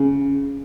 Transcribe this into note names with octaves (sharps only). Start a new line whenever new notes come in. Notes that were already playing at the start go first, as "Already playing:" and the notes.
Already playing: C#3